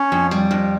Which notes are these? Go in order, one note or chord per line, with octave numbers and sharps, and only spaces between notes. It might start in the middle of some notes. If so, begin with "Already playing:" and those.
Already playing: C#4
F2
G3
F2